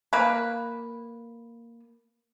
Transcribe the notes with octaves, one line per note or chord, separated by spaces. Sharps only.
A#3 B4